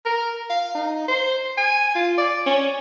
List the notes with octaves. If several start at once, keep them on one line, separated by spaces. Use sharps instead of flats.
A#4
F5
D#4
C5
G#5
F4
D5
C#4